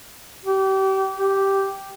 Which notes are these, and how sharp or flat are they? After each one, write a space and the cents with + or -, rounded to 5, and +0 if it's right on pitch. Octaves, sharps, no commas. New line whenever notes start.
G4 -30
G4 -5